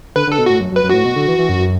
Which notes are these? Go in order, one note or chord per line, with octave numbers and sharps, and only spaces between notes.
D3 B4
D3 A4
B2
A2 F#4
F#2
F#2
B4
F#2
A2 F#4
B2
D3
E3
E3
F#2